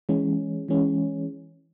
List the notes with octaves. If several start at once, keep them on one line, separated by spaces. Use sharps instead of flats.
E3 G#3 C#4
E3 G#3 C#4